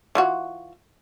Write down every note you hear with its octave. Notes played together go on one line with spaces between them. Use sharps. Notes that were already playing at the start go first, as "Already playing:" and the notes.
E3 F4 F#4